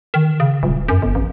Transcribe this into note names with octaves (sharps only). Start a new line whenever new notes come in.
D#3
C#3
D#1
F#2
G1
A1